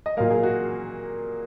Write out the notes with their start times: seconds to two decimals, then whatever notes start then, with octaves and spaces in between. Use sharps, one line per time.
0.06 D#5
0.17 A#2 F#3 A#3 F5
0.30 G#4
0.43 F#4